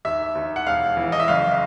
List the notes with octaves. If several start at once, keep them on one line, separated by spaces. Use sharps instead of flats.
D#2 E5
D#2
F#5
E1 F5
E3
D#5
E5
F#1 F5